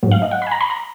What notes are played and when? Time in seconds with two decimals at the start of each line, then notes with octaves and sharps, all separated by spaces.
0.03 G#2 F#3
0.11 F5
0.22 D#5
0.31 F#5
0.42 B5
0.47 G#5
0.51 A#5
0.61 B5
0.70 A#5